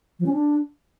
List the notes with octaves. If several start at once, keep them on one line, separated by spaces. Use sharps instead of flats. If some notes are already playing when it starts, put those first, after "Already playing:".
F3
C#4
D4